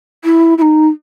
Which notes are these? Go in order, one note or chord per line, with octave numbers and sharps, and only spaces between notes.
E4
E4
D#4